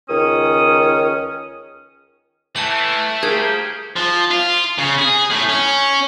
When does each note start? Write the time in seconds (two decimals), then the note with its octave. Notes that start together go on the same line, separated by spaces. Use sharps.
0.09 C#2 D#3 C#4 D#6
2.56 A2 E3 A3 A5 C#7 F#7
3.23 F3 A#3 G4 G#4 A#4 G#6
3.96 F3
4.31 F4
4.78 C#3
4.99 G#4
5.31 A2
5.49 C#4